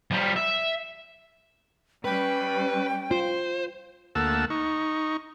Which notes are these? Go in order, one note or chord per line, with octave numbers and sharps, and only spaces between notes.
F3 G3
E5
G3 C#4 B4 G5
F4 C5
D2 A3 A#3 F#5 A5 E6
D#4 C#6